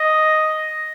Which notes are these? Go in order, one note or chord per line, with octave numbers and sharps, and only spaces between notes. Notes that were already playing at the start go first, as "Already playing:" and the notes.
Already playing: D#5